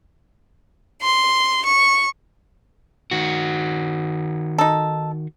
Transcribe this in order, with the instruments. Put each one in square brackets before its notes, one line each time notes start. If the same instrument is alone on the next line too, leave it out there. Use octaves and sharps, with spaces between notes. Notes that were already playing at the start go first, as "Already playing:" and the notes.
[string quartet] C6
C#6
[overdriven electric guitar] D#3 F#4
[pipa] D#4 A4